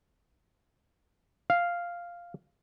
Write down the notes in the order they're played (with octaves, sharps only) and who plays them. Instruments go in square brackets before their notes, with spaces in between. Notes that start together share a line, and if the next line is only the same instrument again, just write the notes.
[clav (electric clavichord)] F5